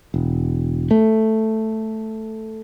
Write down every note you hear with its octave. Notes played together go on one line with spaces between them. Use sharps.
E1
A3